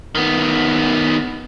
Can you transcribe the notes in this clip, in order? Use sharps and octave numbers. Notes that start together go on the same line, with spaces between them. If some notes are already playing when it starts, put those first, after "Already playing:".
D#3 B3